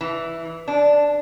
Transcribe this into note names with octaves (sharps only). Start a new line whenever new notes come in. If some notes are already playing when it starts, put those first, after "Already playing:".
E3
D4